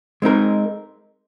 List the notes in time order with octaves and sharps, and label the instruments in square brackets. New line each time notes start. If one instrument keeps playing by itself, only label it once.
[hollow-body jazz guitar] G#3 C4 D#4 A#4